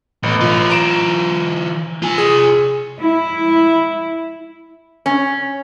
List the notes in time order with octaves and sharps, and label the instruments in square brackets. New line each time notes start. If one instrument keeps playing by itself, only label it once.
[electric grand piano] A1 [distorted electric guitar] B2 B3
[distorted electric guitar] E3 F4
[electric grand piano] A#5 D7 E7
[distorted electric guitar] F4 G#5
[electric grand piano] G#4
[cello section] E4
[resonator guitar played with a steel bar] C#4